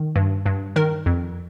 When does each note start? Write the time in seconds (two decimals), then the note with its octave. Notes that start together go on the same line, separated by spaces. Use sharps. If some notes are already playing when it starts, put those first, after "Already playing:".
Already playing: D#3
0.16 G2
0.46 G2
0.76 D#3 A#4
1.06 F2